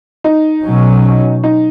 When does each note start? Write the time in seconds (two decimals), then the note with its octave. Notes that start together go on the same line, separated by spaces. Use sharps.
0.24 D#4
0.64 B2 F#3 C#4
1.44 D#4